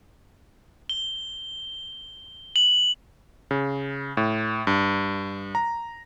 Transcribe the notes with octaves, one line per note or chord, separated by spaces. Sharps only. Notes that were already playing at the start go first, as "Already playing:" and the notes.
G7
F#7
C#3
A2
G2
A#5